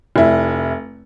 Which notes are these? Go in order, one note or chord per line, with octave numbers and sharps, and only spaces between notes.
F1 E4